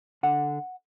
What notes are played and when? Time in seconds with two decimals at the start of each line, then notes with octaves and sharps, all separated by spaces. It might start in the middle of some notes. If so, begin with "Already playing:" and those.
0.23 D3 F#5